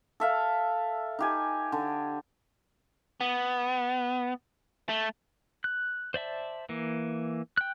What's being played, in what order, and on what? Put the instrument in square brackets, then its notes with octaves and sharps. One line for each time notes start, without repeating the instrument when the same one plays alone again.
[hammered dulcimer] A4 E5 F5
D#4 G4 G#5
D3
[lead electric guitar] B3
A3
[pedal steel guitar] F#6
C5 D5 E5 A5
E3 A#3
G5 F#6